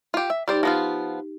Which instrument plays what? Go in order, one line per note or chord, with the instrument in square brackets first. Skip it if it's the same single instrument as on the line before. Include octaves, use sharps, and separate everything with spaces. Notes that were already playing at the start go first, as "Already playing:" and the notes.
[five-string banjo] F4 G4
E5
[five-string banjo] G3 C5 D5 [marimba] D#4 G4
[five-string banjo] F3 B3 F4 [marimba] A#6